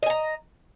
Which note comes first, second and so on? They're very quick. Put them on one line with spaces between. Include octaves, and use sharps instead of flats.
D#5 G#5 A#5